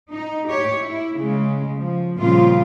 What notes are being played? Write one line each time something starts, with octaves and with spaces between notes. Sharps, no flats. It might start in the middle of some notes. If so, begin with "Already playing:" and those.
D#4
G4 C#5
E4
C#3 G#3
F3
A#2 C#3 F3 G3 C4 F4